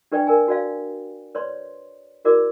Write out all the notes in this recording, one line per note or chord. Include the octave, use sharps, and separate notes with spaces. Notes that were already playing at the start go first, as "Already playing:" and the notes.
D4 G4 B4 D5 G5
A#4 D5 G#5
F#4 D5 F5
B4 C#5 D5 C6
E4 F#4 A#4 D5 D6